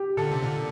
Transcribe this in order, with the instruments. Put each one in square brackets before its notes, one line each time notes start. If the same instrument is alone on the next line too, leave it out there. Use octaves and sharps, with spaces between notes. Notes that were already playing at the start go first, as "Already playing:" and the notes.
Already playing: [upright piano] G4
[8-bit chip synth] A#2 D3 [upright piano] A4
[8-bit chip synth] C3
A#2 D3